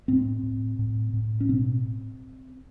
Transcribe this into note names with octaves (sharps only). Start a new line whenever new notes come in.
A2 C4
A2
A2
A2
C#4
B2 C4